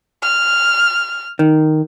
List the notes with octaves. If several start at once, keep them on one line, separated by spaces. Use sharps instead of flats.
F6
D#3